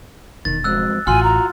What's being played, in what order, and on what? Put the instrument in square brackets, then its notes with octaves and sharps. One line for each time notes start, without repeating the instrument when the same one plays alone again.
[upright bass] E1 [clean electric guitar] D#3 [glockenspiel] A6
[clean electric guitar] F2 G#2 F#3 [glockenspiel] E6 F#6
[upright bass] A1 [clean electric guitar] F4 F#4 [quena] G#5 [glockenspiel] C6 F6
[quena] A#5